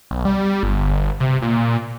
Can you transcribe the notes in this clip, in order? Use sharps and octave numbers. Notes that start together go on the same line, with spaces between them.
B1
G3
G1
C3
A#2